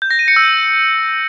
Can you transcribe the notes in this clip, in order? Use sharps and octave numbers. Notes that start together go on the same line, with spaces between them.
G6
A#6
D#7
C#7
E6